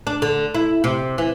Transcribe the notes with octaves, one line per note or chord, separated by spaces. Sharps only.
D4
D3
E4
C3
E3